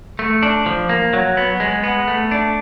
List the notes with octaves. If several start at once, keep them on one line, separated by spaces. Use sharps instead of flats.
A3
D4
F3
A#3
F#3
B3
G#3
B3
A3
D4